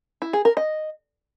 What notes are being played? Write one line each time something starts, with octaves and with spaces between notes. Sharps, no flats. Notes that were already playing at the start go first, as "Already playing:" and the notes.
E4
G#4
A#4
D#5